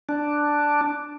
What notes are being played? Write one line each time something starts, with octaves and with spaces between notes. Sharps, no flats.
D4